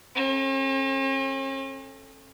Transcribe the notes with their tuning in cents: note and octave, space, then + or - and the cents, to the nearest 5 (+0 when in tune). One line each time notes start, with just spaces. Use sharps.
C#4 -45 A4 +0